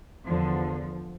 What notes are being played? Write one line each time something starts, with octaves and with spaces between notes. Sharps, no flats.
E2 D3 F3